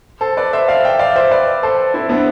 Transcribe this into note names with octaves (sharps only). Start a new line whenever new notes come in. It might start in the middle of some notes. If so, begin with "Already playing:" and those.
A4 C5
B4 D5
C5 E5
D5 F5
E5 G5
D5 F5
C5 E5
B4 D5
A4 C5
C4 E4
B3 D4